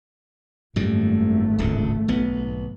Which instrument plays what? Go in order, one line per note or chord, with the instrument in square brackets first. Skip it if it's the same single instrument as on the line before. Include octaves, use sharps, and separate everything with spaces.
[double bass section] G#1 A3 [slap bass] F#2 A#2 G3
[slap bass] D1 C#2 D3
B1 B3